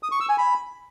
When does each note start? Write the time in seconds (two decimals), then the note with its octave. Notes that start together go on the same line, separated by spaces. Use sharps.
0.03 D#6
0.12 C#6
0.20 E6
0.29 G#5
0.38 B5